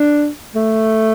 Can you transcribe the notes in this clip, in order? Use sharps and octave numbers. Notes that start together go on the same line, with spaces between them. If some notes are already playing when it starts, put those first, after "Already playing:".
Already playing: D4
A3